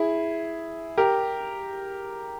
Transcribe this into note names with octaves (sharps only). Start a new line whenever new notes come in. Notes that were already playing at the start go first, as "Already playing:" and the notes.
Already playing: E4 G#4
G4 A#4